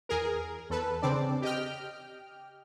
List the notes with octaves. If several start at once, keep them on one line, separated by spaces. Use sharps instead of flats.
E2 G#4 A#4
E2 A4 B4
C#3 C4 D4 D5
G4 D#5 G5 F6